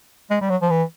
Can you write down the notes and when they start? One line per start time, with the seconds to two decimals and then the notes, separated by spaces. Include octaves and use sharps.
0.31 G#3
0.41 G3
0.50 F#3
0.62 F3
0.70 E3